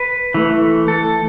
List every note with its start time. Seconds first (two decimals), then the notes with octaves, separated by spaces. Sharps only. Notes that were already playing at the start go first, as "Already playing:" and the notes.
Already playing: B4
0.34 E3 A3
0.88 A4